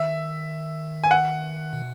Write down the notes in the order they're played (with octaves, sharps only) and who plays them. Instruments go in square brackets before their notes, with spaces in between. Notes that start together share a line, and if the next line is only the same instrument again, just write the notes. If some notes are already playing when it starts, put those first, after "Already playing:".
Already playing: [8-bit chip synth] D#3 [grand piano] E5
[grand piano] G#5
F#5
[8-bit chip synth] B2